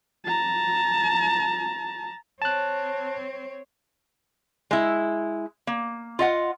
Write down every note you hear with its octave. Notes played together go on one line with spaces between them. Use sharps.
A5 A#5
C4 C#5 A5 F#6
G#3 E4
A#3
F4 D#5 F#5